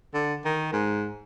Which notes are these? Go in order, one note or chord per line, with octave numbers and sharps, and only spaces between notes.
D3
D#3
G#2